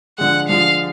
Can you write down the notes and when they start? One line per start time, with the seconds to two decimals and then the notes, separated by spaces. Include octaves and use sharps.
0.18 D3 F3 G#3 F#5
0.48 D3 F3 G#3 F5